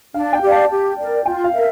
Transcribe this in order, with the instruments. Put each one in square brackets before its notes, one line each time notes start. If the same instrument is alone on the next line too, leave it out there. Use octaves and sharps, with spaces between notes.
[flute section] D4 [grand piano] F5
[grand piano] G5
[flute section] G4 D5 F5
[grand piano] A5
[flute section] G4
A#4 D5
[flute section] F4 [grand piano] G5
[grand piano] F5
[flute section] A#4 E5